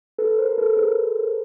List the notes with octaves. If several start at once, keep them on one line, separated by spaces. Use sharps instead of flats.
A4 B4
A#4 C5
A4 B4
G#4 A#4